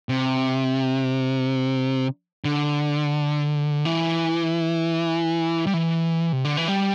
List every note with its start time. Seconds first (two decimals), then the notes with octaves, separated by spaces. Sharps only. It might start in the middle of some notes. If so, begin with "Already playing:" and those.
0.09 C3
2.45 D3
3.85 E3
5.67 G3
5.74 E3
6.32 C3
6.45 D3
6.57 E3
6.68 G3